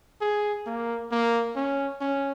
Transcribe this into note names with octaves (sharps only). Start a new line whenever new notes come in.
G#4
A#3
A#3
C#4
C#4